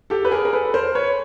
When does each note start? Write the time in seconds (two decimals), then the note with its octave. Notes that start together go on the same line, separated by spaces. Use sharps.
0.10 G4 A4
0.25 B4
0.31 G#4 A#4
0.45 A#4
0.53 A4 B4
0.74 A#4 C5
0.95 B4 C#5